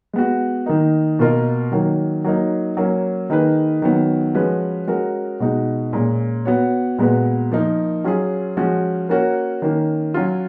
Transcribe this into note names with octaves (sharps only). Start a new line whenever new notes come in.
G#3 B3 F#4
D#3 A#3 D#4
B2 A#3 F4 A#4 D#5
D#3 F#3 A#3
F#3 A#3 D#4
F#3 A#3 C#4
D#3 A#3 D#4 G#4 B4
D#3 F#3 B3
F3 G#3 C#4 F#4 B4
G#3 C#4 F#4 A#4
B2 G#3 D#4 F#4
A#2 G#3 C#4
B3 F#4 C#5
A#2 G#3 B3 F#4 B4
F3 A#3 D#4 A#4
F#3 C#4 F4 G#4
F3 G#3 C#4 F#4
A#3 C#4 F#4 A#4 C#5
D#3 A#3 C#4
F#3 C#4 F4